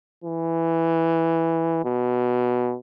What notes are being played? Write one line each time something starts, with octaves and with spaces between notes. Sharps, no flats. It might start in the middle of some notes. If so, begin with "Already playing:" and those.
E3
B2